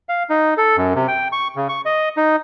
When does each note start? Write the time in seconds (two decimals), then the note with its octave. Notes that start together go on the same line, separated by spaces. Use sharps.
0.09 F5
0.30 D#4
0.58 A4
0.77 F#2
0.95 C3
1.08 G5
1.32 C#6
1.56 C#3
1.69 C#6
1.86 D#5
2.17 D#4